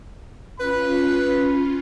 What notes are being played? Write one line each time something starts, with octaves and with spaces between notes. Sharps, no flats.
C#4 F4 B4 B5